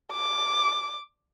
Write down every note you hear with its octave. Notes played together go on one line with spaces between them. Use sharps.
D6